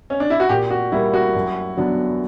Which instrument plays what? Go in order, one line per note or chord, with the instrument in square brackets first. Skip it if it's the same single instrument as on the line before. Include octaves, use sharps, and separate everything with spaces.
[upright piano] C#4
D4
E4
F#4
[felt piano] A#2 [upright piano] G4
[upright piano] F#4
[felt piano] G3 A#3 [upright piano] E4
[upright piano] F#4
[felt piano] F#2
D3 F#3 B3 D4